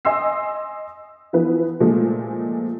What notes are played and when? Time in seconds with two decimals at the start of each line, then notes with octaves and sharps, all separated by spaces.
0.05 D#5 G#5 C6 E6 C7
1.33 E3 F3 B3 B4
1.80 A#2 F3 G#3 A3